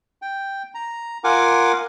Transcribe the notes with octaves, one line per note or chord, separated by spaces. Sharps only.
G5
A#5
F4 A#4 F#5 G#5 D6